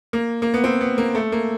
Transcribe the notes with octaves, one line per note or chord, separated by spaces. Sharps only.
A#3
A#3
B3
C4
B3
A#3
A3
A#3